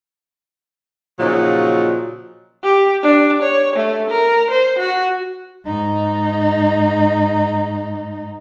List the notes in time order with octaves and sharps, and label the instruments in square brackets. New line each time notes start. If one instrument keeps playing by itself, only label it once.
[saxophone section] A#2 C#3 F3 F#3 D#4
[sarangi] G4
D4
C#5
A3
A#4
C5
F#4
[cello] G#2 D#4